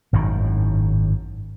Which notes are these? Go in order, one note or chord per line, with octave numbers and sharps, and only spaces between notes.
G#1 F#2 A2 D#3